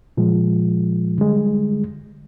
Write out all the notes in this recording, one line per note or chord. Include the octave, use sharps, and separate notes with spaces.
A#2 F3 G#3
D3 G3 G#3